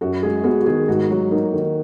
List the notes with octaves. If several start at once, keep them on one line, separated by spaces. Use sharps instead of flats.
F#2 F#4
G#3 G#4
B3 F#4
F#4
D#3 G#4
G#2 F#4
F#3 F#4
A#3 D#4
D#3